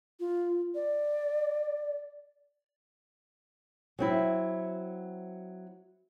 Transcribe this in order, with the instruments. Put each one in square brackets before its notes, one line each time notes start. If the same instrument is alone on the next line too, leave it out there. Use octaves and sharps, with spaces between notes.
[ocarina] F4
D5
[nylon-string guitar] F#3 C4 E4